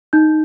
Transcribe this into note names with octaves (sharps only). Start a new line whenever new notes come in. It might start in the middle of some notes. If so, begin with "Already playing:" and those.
D#4 G6